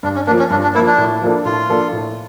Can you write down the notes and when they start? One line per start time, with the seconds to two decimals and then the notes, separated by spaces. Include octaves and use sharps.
0.03 G2 D4
0.15 C#4
0.27 F3 A#3 D4
0.39 C#4
0.50 G2 D4
0.63 D4
0.75 A#3 E4
0.79 F3
0.86 D4
0.98 A2
1.22 F3 A#3 D4 A4
1.45 A2 F4
1.69 F3 A#3 D4 A4
1.93 A2